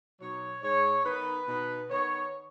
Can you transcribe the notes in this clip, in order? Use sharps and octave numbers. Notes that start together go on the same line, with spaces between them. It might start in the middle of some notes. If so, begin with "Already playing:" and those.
B2 F#3 D#4 C#5
G#2 G#3 D#4 C#5
D#3 B3 D#4 B4
B2 B3 D#4
D#3 B3 D#4 C#5